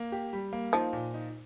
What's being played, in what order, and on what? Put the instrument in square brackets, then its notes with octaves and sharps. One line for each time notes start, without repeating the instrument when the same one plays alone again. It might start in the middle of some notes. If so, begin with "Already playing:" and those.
Already playing: [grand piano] A#3
G4
G3
A#3
[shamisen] F3 [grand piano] D#4
[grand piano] A#2
D#4